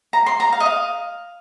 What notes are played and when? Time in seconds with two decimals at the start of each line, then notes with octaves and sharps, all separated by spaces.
0.13 A#5
0.26 C6
0.40 A#5
0.52 F5
0.60 D#5
0.66 F5